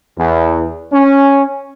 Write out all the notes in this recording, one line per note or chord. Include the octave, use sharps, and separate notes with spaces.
E2
C#4